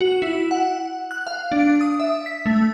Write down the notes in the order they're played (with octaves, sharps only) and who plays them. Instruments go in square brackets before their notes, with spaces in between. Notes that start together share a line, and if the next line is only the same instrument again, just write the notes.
[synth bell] F#4
E4
F#5
F#6
F5
D4
D#6
E5
B6
A3